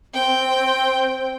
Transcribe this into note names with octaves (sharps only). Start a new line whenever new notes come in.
C4 G5